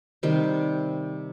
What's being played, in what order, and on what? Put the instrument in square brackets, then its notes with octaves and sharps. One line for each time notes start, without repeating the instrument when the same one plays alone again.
[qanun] C3 D#3 G3